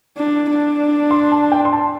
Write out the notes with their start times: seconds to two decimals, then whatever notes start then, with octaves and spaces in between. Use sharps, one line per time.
0.17 D4
0.49 D4
1.11 C6
1.32 A5
1.52 G5
1.65 C6
1.73 A5